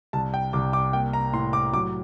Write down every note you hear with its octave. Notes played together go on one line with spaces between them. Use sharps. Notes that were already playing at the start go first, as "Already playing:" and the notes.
C2 A5
G5
C2 D6
D6
A#3 G5
A#5
A2 C6
D6
F#3 D6